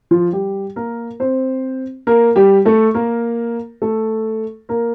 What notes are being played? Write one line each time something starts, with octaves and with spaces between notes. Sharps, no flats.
F3 F4
G3 G4
A#3 A#4
C4 C5
A#3 A#4
G3 G4
A3 A4
A#3 A#4
A3 A4
A#3 A#4